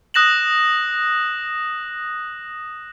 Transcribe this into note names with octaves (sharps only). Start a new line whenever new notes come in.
D#6 F#6 A#6 E7 F#7